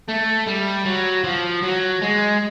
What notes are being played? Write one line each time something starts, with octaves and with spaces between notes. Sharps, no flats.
A3
G3
F#3
F3
F#3
G#3